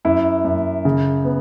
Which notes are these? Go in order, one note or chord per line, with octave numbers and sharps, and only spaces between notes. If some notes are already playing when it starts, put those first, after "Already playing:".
F#2 E4
F#2
C#3
B3